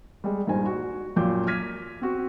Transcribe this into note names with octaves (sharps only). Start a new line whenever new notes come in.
G3 G#3
G2 A#2 D#4 C5 G#5
F#4
F#2 A#2 F3 G5 D6 G6
D6 F6 G#6 B6 D#7
C4 F#4